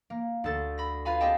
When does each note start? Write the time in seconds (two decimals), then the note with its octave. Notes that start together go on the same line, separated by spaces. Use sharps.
0.10 A#3
0.44 D2 A4 A6
0.78 B5 A#6
1.05 F4 B4 F5 G#5 B5
1.20 C4 G4 G#4 D#5 G5 A5